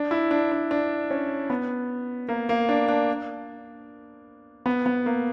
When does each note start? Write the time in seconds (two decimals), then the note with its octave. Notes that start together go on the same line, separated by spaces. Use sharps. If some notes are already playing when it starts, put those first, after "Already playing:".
Already playing: D4
0.11 E4
0.31 D4
0.52 D4
0.71 D4
1.11 C#4
1.50 B3
2.29 A#3
2.49 A#3
2.69 D4
2.88 D4
4.66 B3
4.86 B3
5.06 A#3